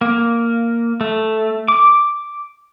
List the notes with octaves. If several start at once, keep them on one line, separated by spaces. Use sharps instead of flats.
A#3
A3
D6